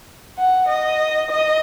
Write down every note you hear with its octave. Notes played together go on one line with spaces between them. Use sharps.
F#5
D#5
D#5